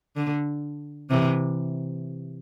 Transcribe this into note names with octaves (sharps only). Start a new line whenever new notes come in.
D3
C3 E3